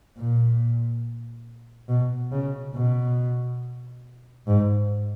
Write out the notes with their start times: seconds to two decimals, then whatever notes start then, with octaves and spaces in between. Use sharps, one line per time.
0.17 A#2
1.89 B2
2.32 C#3
2.75 B2
4.48 G#2